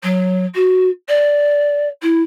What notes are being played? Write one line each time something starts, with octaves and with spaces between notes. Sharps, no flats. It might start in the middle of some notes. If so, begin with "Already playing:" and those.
F#3
F#4
D5
E4